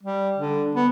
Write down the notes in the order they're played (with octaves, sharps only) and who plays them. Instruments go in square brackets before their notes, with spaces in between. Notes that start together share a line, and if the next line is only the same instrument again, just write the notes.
[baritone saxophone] G3
D3
B3